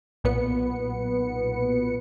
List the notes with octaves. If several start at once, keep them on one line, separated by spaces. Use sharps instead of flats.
B1 A#2 B3 B4 C#7